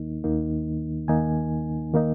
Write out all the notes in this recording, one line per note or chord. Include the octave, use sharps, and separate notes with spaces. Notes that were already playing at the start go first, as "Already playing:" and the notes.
Already playing: D#2 D#3 A#3 D#4
D#2 D#3 A#3 D#4
D#2 D#3 A#3 D#4 G#5
D#3 A#3 D#4